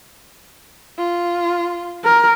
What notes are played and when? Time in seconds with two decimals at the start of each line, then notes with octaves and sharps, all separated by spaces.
0.98 F4
2.05 A#4